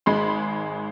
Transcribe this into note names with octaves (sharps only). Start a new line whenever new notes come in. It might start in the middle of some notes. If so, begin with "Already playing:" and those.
G#1 G#3 B5 C6